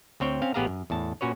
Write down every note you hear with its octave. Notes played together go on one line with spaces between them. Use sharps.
D2 C4 C#5 G5
C4 C#4 F5
A1 B3 G4 G#4 F5 A#5
F#2
E2 A2 A5
A#2 C#4 F#4 B4 C#5